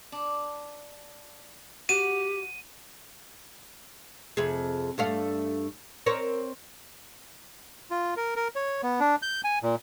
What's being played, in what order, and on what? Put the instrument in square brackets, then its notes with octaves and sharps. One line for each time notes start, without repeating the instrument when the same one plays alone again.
[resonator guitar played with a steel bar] D4
[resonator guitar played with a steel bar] F#4 [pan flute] G4 [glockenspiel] D#7
[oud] F2 C3 G#4
G2 A3 F5
C4 A#4 C#5
[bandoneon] F4
A#4
A#4
C#5
B3
D4
G6
G#5
A#2